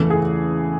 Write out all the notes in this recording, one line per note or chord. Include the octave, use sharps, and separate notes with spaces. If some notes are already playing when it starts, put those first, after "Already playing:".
Already playing: E2 C#3 E3 A3
G#4